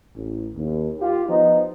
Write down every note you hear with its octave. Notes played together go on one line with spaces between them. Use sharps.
A1
D#2
F4 G4
F3 B3 D#4